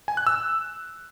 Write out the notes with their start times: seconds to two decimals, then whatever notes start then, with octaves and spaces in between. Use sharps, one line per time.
0.08 G#5
0.17 F#6
0.27 E6